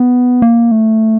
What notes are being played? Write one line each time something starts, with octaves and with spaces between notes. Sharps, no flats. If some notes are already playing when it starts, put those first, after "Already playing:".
Already playing: B3
A#3
A3